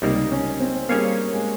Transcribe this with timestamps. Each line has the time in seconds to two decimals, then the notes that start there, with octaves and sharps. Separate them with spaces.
0.02 C#2 C3 G3 A#3 D#4
0.32 C#4
0.60 C4
0.89 G3 A#3 C#4 G#4 C#5 F5
1.34 G#3